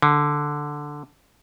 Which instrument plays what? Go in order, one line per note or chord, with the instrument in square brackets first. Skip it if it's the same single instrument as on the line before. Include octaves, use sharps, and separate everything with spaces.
[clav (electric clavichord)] D3